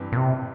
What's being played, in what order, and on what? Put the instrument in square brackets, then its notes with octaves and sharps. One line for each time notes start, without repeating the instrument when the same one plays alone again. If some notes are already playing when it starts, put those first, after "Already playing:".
Already playing: [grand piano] G2 E3 G3 C4
[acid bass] A#2
C3